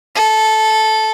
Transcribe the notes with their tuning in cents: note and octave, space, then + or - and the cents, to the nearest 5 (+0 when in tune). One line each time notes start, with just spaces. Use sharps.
A4 -10